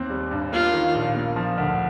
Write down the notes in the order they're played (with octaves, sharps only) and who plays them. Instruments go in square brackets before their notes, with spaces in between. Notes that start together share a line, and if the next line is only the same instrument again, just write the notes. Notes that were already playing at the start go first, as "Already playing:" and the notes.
Already playing: [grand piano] D#2 C4
G3
G2
[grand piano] A#3 [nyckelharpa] F4
[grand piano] D#3
A#1
A#3
F3
D2